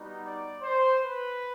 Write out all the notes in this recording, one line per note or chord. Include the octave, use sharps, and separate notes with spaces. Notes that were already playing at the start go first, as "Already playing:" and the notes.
Already playing: G3 B3 D#4 F#4
D5
C5
B4